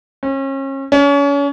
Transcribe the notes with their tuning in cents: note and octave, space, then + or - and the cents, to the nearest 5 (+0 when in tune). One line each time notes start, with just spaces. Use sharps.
C#4 -35
C#4 +35